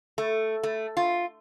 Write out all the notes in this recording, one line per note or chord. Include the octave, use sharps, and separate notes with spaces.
A3
A3
F4